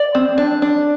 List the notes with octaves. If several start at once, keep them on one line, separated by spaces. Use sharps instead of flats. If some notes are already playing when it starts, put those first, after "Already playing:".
Already playing: D5
C4
D4
D4